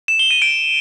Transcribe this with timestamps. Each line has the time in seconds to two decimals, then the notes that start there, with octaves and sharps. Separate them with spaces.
0.08 E7
0.19 G7
0.31 D#7
0.42 D7